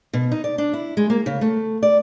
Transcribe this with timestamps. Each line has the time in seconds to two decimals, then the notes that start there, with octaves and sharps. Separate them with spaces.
0.13 B2
0.31 D#4
0.44 D5
0.58 D4
0.73 E4
0.97 G#3
1.10 A#3
1.26 C#3
1.41 A3
1.83 D5